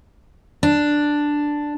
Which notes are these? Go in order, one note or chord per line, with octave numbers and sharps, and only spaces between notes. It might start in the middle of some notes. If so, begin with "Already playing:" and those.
D4